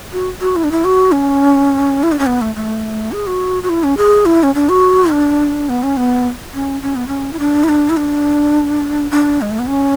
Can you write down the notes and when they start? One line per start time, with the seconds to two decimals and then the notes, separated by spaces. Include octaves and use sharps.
0.13 F#4
0.41 F#4
0.56 E4
0.64 D4
0.71 E4
0.84 F#4
1.12 C#4
2.03 E4
2.12 D4
2.19 C#4
2.26 B3
2.41 A3
2.56 A3
3.12 G#4
3.27 F#4
3.63 F#4
3.69 E4
3.84 C#4
3.97 G#4
4.26 E4
4.43 C#4
4.55 D4
4.69 F#4
5.11 D4
5.69 B3
5.83 C#4
5.97 B3
6.54 C#4
6.82 C#4
6.96 B3
7.08 C#4
7.33 E4
7.39 D4
7.64 E4
7.69 D4
7.90 E4
7.97 D4
9.11 D4
9.41 G#3
9.51 A3
9.59 B3
9.67 C#4